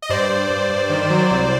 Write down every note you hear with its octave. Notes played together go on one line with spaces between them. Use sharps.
D#5
G2 C5 D5
G2
G2
G2
D#3
F#3
C2